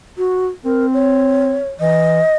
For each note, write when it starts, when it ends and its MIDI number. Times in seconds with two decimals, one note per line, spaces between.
0.18 0.47 66
0.65 1.59 60
0.65 0.86 70
0.94 1.70 73
1.80 2.21 52
1.80 2.36 75